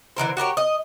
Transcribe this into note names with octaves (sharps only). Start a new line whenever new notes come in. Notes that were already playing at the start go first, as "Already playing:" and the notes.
D3 E3 A#4 C5
F#4 G4 A#4 C#5
D#5